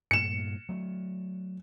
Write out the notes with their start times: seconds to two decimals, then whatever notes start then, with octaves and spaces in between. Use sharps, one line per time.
0.11 G2 A#2 A3 C#7 E7
0.69 F#3 A3